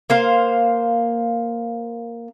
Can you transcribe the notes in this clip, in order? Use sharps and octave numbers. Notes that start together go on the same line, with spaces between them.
A#3 C5 F5